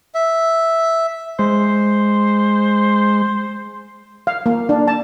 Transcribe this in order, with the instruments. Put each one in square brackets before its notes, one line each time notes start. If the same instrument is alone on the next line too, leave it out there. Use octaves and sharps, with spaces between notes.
[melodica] E5
[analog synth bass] G#3 [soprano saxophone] C5
[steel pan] F5
A#3
D4
A5